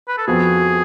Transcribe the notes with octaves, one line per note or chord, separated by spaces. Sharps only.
B4
A4
F2 F3 B3 F#4 G#4